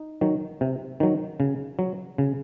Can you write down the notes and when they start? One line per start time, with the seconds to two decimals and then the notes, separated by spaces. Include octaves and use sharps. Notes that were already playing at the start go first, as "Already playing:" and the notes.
Already playing: D#4
0.21 D#3 F#3
0.61 C3
1.00 D#3 F#3
1.40 C#3
1.79 F#3
2.18 C#3